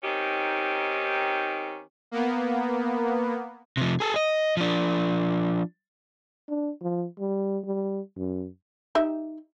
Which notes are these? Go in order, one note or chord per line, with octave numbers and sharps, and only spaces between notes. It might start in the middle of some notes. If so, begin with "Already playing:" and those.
D#3 C4 C#4 D#4 G4
A#3 B3
C3 F3
G#4 A4
D#5
F3 D4
D4
F3
G3
G3
F#2
D#4 G4 E5